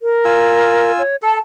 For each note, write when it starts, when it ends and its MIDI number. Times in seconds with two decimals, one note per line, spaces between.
0.02 0.92 70
0.25 1.02 65
0.25 1.02 80
0.25 1.02 88
0.99 1.16 73
1.22 1.38 69
1.22 1.38 81